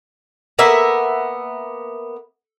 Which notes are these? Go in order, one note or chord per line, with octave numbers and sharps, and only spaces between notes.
A#3 B3 E5